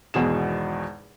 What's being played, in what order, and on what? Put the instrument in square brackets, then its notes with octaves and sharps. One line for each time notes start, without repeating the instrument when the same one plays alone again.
[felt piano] G#1 E2 B2 G#4 E7